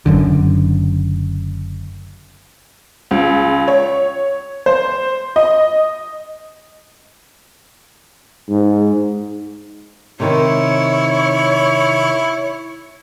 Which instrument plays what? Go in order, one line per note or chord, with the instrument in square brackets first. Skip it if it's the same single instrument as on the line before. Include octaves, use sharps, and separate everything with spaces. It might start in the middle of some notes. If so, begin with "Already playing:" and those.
[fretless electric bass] F#1 F#2 D3
[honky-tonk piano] C#2
C#5
C5
D#5
[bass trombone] G#2
[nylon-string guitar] C3 D#3 D#4 [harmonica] E4 [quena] C#5